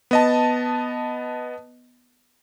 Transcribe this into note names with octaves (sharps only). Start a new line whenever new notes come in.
B3 D#5 A5